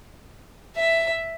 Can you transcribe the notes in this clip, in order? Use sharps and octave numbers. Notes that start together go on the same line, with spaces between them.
E5